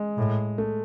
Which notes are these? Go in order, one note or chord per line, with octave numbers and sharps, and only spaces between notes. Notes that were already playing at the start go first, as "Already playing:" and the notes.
Already playing: G#3
A2
A3